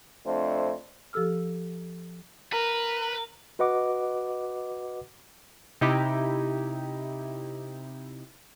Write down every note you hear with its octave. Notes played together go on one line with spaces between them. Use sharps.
F2 A3 D4 C5
F3 G4 A4 E6 F6
A#4 B4
F#4 B4 D#5 F#5 D6
C3 D#4 E4 G4